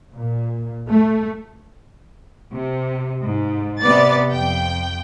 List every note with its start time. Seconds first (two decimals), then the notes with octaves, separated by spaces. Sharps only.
0.13 A#2
0.88 A3
2.53 C3
3.22 G#2
3.81 C3 B3 B4 D5 A6
4.32 F2 G5